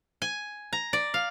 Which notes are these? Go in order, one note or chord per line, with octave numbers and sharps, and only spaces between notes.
G#5
A#5
D5
F5